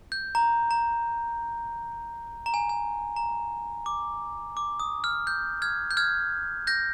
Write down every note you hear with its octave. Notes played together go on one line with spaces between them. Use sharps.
G6
A#5
A#5
A#5
G#5
G#5
A#5
D6
D6
D#6
F6
G6
F6 G#6
G6
F6 G#6
G6 A#6